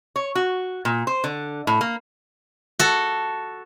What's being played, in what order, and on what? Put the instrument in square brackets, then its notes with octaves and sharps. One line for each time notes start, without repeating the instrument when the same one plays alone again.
[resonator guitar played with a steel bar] C#5
F#4
A#2
C5
D3
A2
A#3
[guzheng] F#4 A4